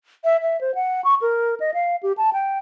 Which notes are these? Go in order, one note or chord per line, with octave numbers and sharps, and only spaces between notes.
E5
E5
C5
F#5
C#6
A#4
D#5
F5
G4
A5
G5